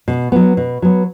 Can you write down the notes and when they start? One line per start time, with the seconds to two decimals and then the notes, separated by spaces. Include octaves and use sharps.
0.08 B2
0.32 F#3 B3
0.57 B2
0.82 F#3 B3